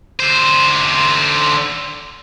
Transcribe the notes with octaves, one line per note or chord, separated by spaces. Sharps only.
D3 C5